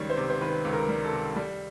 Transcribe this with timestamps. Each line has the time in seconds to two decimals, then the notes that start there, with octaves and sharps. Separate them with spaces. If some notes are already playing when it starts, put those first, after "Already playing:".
Already playing: C#2 D#3 G3 C#5
0.10 C5
0.17 C3
0.30 C5
0.41 D#3 B4
0.65 C#2
0.72 A#4
0.88 G3
1.05 A4
1.12 C3
1.36 G3